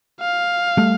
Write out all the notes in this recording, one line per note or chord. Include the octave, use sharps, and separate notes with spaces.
F5
G3 A3